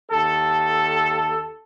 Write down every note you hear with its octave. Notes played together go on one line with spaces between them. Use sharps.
D#2 A4